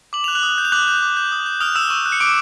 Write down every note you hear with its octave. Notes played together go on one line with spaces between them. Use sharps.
D6 F#7
F#6 F7
F#6 F#7
D#6
G6
F7
D6 F#6 F#7
G6
D6
G6
D#6
G6
D#6 F6 F7
E6 F#6 E7
C#6
F#6
C#7
D6 D7